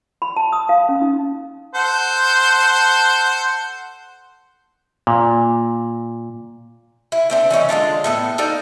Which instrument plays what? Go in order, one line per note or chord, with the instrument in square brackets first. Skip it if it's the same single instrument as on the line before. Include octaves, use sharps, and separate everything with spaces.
[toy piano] B5
A5
D#6
F5
C#4
D#4
[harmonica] A4 C5 F#5
[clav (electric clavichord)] A#2
[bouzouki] E4
A3 C4 D4
E3 A3 C#4 D#4
D3 G#3 D4 F4
A2 B3 A4
D#4 A4 D5 F5